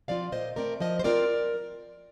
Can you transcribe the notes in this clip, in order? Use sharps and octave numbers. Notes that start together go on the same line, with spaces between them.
F3 C4 F4 D5 F5
A#2 C5 D#5
A3 C4 A#4 D5
F3 C5 D#5
C5
C4 F4 A#4 D5